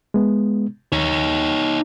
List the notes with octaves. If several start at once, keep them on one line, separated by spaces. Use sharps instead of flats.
G#3 B3
D#2 D#4 C#5